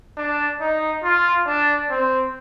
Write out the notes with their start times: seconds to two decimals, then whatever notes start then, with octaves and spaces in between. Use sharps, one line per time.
0.18 D4
0.61 D#4
1.04 F4
1.47 D4
1.90 C4